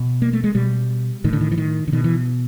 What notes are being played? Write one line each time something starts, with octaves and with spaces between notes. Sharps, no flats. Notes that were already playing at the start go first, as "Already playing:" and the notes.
Already playing: B2
A#3
A3
G#3
B2 G3
A2 D#3
D3
D#3
E3
D#3
D3
B2 D#3
E3